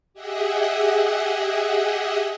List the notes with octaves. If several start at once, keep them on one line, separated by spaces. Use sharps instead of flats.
G4 G#4 D#5 E5 F#5